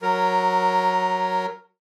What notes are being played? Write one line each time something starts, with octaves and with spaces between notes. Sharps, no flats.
F#3 A#4